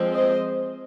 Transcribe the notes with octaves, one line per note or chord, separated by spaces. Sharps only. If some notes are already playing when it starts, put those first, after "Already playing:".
Already playing: F3 G#3 C4
C5 D#5